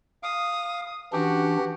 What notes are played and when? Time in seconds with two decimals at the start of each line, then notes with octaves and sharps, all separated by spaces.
0.23 F5 D#6
1.13 E3 C#4 D4 F#4 G4